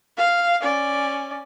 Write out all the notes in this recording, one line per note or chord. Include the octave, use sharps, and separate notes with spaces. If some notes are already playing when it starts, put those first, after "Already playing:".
F5
C#4 D5